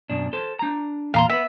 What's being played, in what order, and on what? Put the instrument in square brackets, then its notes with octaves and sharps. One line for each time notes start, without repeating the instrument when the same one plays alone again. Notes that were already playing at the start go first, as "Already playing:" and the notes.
[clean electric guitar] F#2 B2 D4
A4 C5
D4 A#5
[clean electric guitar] E2 A#2 [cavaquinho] F5 A#5 C6
[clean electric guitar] B3 B4 [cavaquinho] E5